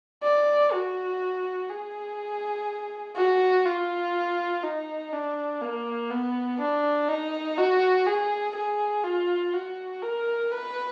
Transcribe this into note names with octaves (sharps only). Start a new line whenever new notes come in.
D5
F#4
G#4
F#4
F4
D#4
D4
A#3
B3
D4
D#4
F#4
G#4
G#4
F4
F#4
A#4
B4